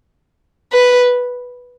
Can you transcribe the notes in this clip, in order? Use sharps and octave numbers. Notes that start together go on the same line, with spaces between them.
B4